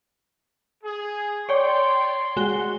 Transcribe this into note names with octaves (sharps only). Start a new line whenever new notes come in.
G#4
C#5 D5 G5 C6
G#3 F#4 G7